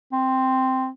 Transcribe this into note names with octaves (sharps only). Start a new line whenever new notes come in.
C4